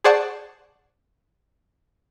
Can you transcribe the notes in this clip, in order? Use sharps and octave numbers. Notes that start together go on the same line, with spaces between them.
G#4 C5 D5 F#5 A5 C#6